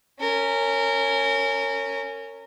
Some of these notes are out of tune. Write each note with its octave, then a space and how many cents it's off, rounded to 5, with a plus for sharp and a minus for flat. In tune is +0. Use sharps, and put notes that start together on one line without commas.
C#4 +0 A#4 -25